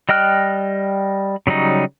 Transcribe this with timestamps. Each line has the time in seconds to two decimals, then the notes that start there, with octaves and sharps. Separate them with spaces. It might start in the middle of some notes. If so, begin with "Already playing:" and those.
0.09 G3 D#5 G5 F6 F#6
1.47 C#3 F#3 G3 D#4